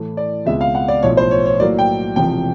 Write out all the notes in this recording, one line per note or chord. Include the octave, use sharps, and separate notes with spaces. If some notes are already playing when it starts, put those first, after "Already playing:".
Already playing: A2 E3 A3
D5
C#2 B2 G#3 C4 E5
F5
F#5
D5
B1 A2 F3 C#5
C5
C#5
C#5
A2 F#3 A#3 D5
G5
E1 E2 C3 F3 G5